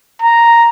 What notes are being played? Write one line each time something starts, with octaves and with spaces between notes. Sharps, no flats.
A#5